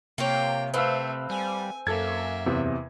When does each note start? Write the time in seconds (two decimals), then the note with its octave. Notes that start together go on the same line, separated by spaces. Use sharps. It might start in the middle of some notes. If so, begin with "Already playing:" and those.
0.18 C3 A#3 F4 C#5 G5
0.74 A3 C4 B4 F5 E6
1.30 G3 G#5
1.87 F#2 A#3 A4 E5 G#6
2.46 E2 C3